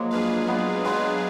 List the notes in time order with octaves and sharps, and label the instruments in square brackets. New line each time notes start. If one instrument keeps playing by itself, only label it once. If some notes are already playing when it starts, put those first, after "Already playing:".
Already playing: [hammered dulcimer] F3 G#3 A#3 [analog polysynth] F#3
[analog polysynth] D4 G#4 B4 F5
[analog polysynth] F#3 [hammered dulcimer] B3 D#4
[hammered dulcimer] G#3 B3 [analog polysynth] D4 G#4 B4 F5